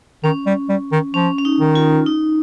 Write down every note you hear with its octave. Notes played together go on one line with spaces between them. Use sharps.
D#3 C#4
G3
G3
D#3
F3 C#4
C#4
D#4
D#3
F4
D#4